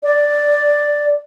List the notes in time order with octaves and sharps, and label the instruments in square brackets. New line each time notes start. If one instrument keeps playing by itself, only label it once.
[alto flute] D5